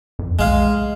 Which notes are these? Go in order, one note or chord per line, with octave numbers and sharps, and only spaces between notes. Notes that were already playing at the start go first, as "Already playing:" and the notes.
F2
B1 G#3 F5